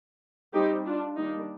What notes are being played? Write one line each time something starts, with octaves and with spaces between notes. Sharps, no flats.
G3 C4 D#4 G4
D4 F4
D#3 G3 A#3 D4 D#4